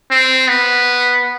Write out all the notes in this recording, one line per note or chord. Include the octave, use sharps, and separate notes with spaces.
C4
B3